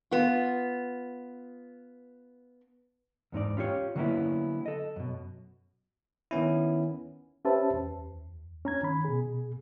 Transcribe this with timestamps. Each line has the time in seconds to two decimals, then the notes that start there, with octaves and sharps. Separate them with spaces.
0.11 B3 F4
3.32 E2 G#2 D#4 D5
3.57 C#4 F4 G4 C#5
3.96 D3 F#3 A#3 B3 C#4 E4
4.66 A4 D#5
4.96 F#2 B2
6.31 D#3 B3 C#4 E4
7.45 C#4 G4 B4 C5 E5 A5
7.74 E2
8.65 C#4 A#5 G#6
8.83 D#3 B5
9.05 B2 G#4